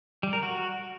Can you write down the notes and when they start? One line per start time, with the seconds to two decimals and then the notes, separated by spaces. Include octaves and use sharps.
0.23 G3
0.33 A#4
0.42 F#4